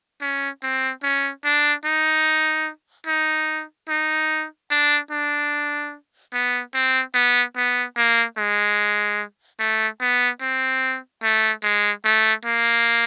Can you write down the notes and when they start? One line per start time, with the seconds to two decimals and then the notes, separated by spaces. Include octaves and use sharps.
0.21 C#4
0.63 C4
1.03 C#4
1.45 D4
1.85 D#4
3.07 D#4
3.89 D#4
4.71 D4
5.11 D4
6.33 B3
6.74 C4
7.14 B3
7.56 B3
7.97 A#3
8.38 G#3
9.59 A3
10.01 B3
10.41 C4
11.23 A3
11.63 G#3
12.05 A3
12.45 A#3